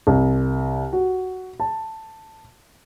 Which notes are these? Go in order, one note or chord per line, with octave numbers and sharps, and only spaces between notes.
C2
F#4
A5